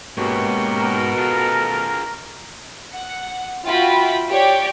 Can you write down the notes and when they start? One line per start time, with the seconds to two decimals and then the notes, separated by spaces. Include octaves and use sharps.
0.18 G#2 B2 G#3 A#3 C#4 G4
0.70 A#4
1.18 F4 G#4 A4
2.93 F#5
3.66 F4 F#4 E5 G5 B5
4.30 G4 C#5 D5 G5